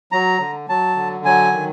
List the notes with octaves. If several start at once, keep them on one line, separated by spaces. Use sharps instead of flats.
F#3 A#5
D3
F#3 A5
D3
F#3 G#5
D#3